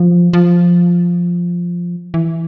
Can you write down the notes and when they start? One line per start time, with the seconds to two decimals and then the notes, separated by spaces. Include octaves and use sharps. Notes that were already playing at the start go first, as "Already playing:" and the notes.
Already playing: F3
0.33 F3
2.14 E3